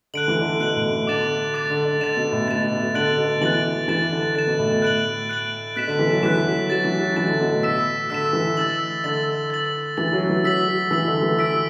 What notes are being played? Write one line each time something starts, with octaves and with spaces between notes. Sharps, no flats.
D3 F#6 D7 F#7
E3
D3
B2 F#6 D7 F#7
A2
B2
D3 D6 A6 E7
D6 A6 E7
D3
D3
D3 A6 E7
B2
A2
B2 A6 E7
A2
B2
D3 F#6 A6 D7 F#7
B2
E3 F#6 A6 D7 F#7
E3 A6 E7
D3
D3 A6 E7
B2
A2
A2
F#6 D7 F#7
F#6 D7 F#7
B2 F#6 B6 E7
D3
E3
F#3
E3 F#6 B6 E7
F#3
F#3 A6 E7
E3
F#3
E3 A6 E7
D3
B2
A2
E6 B6 E7
D3 E6 B6 E7
E3
E6 A6 F#7
D3 E6 A6 F#7
A6 F#7
E3 A6 F#7
F#3
E3
F#3 E6 B6 F#7
F#3
E3 E6 B6 F#7
D3
E3
E6 B6 D7